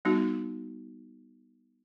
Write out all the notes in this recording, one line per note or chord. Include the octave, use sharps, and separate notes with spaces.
G3 B3 D#4 F#4